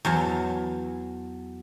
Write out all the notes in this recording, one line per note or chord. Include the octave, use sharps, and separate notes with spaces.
E2 F#3 A5